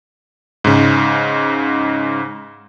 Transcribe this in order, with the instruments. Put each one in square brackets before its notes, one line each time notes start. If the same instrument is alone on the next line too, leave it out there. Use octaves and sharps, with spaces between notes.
[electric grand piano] G#2 C#3